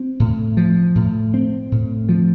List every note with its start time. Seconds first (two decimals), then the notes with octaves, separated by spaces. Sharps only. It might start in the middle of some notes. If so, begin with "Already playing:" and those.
Already playing: C4
0.20 A2
0.57 F3
0.95 A2
1.34 C4
1.72 A2
2.09 F3